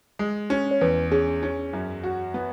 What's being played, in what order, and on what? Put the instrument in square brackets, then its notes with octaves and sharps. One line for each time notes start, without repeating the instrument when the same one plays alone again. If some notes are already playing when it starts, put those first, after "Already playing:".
[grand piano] G#3
C#4
[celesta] C#5
[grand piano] E2 [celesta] B4
[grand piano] C#4 [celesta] G#4
[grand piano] C#4
F#2
F#4
B3